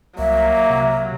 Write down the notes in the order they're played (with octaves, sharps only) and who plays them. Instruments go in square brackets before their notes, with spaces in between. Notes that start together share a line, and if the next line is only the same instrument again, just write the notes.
[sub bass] C2 [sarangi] F#3 [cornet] A#3 [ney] E5
[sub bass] C3